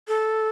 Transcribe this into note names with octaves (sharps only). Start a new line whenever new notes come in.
A4